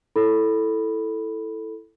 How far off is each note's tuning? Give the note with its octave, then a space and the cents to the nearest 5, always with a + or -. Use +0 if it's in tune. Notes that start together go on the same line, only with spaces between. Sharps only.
E4 +5 A4 +0 B5 +0